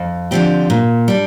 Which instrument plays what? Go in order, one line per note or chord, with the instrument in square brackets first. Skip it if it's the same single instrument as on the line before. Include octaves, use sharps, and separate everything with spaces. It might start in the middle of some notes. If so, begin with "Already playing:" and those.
Already playing: [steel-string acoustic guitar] F2
D3 F3 C4 G4
A#2
G3 D4